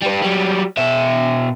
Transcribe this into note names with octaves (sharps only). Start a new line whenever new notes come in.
G3 B4
F#3 G3
B2 E5